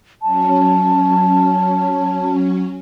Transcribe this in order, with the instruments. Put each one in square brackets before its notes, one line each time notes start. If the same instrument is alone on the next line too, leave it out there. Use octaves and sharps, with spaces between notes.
[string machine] F#3 C#4 [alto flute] A5